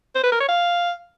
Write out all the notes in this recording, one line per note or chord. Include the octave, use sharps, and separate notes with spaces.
C5
B4
A#4
C#5
F5